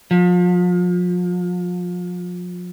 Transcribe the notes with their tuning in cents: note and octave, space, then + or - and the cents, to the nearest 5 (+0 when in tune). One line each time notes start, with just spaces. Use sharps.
F3 +35